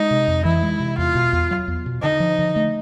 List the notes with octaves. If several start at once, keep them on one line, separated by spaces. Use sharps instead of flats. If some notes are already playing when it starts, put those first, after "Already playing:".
Already playing: G#3 D#4
C3
F2
E3 E4
G#3
C3
E2 F4
B2
E2
F#3
E2
B2
D3 D#4
F3
D3
A3